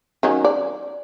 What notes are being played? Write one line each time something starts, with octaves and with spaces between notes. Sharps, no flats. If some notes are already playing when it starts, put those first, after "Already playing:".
D#3 F#3 C#4
D5